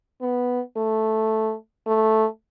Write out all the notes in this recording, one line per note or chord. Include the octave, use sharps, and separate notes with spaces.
B3
A3
A3